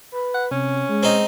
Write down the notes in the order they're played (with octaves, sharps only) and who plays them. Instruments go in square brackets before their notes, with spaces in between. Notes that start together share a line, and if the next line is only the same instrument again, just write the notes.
[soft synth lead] B4
[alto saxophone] F#5
[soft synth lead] C3 [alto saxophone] C#4
[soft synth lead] G#3
[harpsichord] C4 D#4